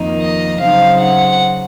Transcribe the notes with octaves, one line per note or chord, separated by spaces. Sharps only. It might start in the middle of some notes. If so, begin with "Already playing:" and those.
Already playing: F2 D#3 A#3 D#4
D#5
C#3 F#3 C4 D#4 F5
F#5